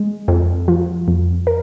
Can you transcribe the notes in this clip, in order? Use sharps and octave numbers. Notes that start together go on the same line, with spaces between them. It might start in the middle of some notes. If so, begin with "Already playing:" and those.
Already playing: G#3
F2
F3
F2
A#4